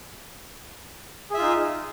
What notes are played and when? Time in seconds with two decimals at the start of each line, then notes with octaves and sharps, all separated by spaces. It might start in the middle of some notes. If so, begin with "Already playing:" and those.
1.30 G#4
1.34 E5
1.38 F4
1.42 D#4